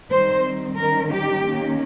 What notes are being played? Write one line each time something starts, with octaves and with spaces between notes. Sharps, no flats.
D#3 G3 C4 C5
D#3 G3 C#4 A#4
G4
D#3 A#3 C#4